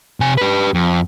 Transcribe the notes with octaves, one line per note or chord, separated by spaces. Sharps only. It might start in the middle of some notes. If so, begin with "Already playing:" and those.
C3 G#5
G4 B4
F2